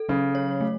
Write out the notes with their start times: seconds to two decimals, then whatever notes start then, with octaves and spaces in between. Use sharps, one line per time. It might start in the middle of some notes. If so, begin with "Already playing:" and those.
Already playing: A4
0.09 C#3 F#3
0.35 C#5
0.61 A3